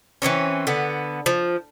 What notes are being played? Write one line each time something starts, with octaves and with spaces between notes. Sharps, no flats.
E3 F3 C4 C#4
D3 B3
F3